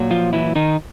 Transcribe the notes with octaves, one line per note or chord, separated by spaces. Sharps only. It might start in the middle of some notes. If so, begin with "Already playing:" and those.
Already playing: A#2 F#3
F3 F4
E3 E4
D#3 D#4